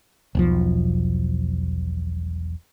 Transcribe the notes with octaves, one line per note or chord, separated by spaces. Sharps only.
E1 B1 F3